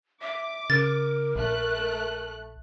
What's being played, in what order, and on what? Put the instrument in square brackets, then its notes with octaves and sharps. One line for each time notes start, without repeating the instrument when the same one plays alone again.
[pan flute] E5 [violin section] D6
[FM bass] C#3 [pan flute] A#4 [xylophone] A6
[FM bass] A#1 [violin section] A3 F#6